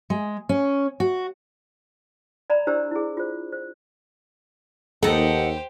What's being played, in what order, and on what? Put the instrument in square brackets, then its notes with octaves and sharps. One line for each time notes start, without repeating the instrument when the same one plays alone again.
[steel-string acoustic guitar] G#3
C#4
F#4
[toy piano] D5 A#5 B5
D4 E4 G4 C5 A#5 E6
E4 G#4
F4 C5
C5
[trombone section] D#2 [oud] D#4 A4 [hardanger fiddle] G4 C5 [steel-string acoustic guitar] F#5